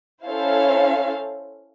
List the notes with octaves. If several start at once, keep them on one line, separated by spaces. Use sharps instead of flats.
C#4 E4 A4 C5 F5